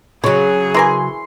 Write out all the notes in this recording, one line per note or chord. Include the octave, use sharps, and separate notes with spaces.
C#3 F#3 G#4 C#5
E3 A#4 G#5 C6